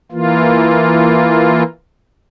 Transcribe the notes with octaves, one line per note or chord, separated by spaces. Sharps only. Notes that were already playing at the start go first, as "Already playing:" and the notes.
E3 A#3 F4